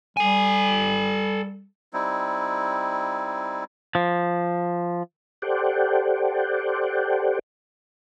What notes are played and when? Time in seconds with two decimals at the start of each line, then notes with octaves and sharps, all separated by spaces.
0.17 G3 A4 G#5
1.93 G3 C4 D#4 E4
3.95 F3
5.42 G4 A4 C5 D5 F#5 G5